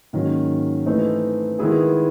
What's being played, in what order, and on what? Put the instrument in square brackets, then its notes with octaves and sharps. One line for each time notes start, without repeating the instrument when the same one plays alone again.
[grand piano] G#2 D#3 F#3 A#3 C#4
E3 A3 C4 D#4
D#3 G#3 B3 E4 G#4